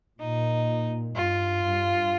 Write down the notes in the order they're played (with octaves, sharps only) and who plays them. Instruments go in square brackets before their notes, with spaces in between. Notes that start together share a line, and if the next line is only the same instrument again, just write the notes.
[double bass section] A#2 [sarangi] D#4
[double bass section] G2 [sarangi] F4
[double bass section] G2